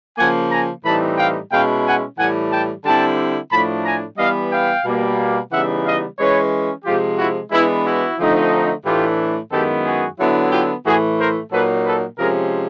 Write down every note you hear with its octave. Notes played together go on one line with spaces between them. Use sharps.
C#3 F3 A#3 F#5 G#5
G#5 A#5
A2 E3 G3 C4 D#4 A5 B5
F5 G5
B2 G#3 C#4 E4 F5 G5
F#5 G#5
A2 E3 G3 F#5 G#5
G5 A5
D3 G3 C4 E4 G5 A5
A2 F3 A3 D4 A5 B5
G#5 A#5
E3 G3 B3 D#5 F5
F5 G5
B2 G3 A#3
C#3 E3 G3 B3 D#4 E5 F#5
D#5 F5
E3 G#3 C#4 B4 C#5
C3 F3 G#3 F4 G4
E4 F#4
E3 G#3 B3 D4 E4
E4 F#4
D3 F3 A3 C4 D#4
A2 E3 A3 D4 F4 G4
F#2 D#3 G#3 B3 E4 G4 A4
F#4 G#4
D3 F#3 B3 E4
F4 G4
A2 E3 A3 F#4 G#4
A#4 C5
A#2 F#3 A#3 D#4 A4 B4
A4 B4
C3 F3 G#3 C#4 G#4 A#4